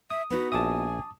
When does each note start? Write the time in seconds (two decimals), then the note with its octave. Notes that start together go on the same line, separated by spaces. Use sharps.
0.10 E5 D#6
0.30 B3 D#4 F#4 B4
0.52 A#1 E5 G#5 A5 D6 D#6